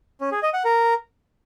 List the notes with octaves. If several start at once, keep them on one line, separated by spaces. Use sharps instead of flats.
C#4
G#4
D#5
F#5
A#4